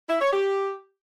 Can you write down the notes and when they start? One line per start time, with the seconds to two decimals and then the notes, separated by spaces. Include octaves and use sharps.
0.09 E4
0.21 C#5
0.32 G4